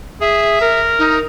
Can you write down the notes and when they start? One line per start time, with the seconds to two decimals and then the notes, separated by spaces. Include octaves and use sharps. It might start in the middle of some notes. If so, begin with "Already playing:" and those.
0.21 G#4 E5
0.61 A#4
0.99 D#4